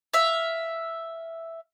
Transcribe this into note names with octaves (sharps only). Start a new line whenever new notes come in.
E5 F5